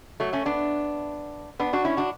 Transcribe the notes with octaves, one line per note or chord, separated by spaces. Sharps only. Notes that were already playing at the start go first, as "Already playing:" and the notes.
F#3 A3
A3 C#4
B3 D4
B3 D4
D4 F#4
C#4 E4
D4 F#4